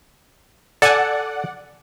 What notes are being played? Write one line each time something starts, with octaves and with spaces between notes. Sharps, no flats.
A4 D5 F#5 G#5